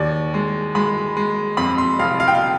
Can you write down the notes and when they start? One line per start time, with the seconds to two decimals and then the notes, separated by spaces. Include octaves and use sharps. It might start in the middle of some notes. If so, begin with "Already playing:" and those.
Already playing: D#2 D5
0.34 G#3
0.75 G#3 B5
1.17 G#3
1.57 F2 B5
1.78 C6
1.99 F1 F5
2.20 F5
2.28 G5
2.35 F5